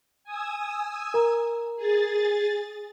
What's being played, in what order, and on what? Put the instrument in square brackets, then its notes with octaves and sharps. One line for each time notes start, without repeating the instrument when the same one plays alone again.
[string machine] G#5 D#6 E6
[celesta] A#4 A#5
[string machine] G#4 A6